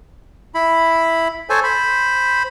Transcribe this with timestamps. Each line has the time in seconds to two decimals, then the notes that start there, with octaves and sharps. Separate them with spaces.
0.55 E4 B5
1.50 A4 C5 C#5 G#5
1.64 C5 B5